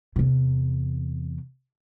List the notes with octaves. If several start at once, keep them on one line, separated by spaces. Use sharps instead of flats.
E2 C3